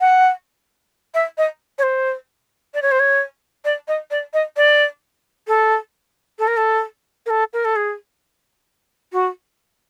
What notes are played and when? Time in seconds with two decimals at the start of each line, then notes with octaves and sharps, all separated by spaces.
0.01 F#5
1.14 E5
1.38 D#5
1.79 C#5
1.83 C5
2.74 D5
2.82 C#5
2.92 C5
3.00 C#5
3.65 D5
3.88 D#5
4.11 D5
4.34 D#5
4.57 D5
5.48 A4
6.39 A4
6.48 A#4
6.57 A4
7.26 A#4
7.30 A4
7.53 A#4
7.65 A4
7.76 G#4
9.13 F#4